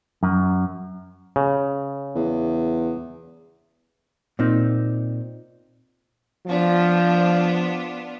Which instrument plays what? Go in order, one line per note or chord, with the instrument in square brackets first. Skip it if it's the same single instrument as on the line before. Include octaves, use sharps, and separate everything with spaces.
[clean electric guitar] F#2
[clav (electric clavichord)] C#3
[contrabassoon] E2
[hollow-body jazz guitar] A#2 C4 D#4
[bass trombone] F3 [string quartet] B3 D4 F4